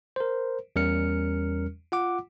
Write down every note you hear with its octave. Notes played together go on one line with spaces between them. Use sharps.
A#4 C5
E2 G3 C#4 A#4 F6 C#7
F4 F#5 D6